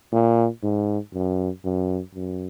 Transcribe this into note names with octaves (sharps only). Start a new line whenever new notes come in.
A#2
G#2
F#2
F#2
F#2